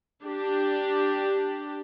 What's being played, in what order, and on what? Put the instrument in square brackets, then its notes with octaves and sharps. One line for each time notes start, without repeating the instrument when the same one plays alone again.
[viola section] D4 G4